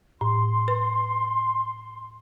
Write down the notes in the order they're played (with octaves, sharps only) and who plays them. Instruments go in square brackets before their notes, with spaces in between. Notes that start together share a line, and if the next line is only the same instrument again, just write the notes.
[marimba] A2 [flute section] C6
[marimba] B4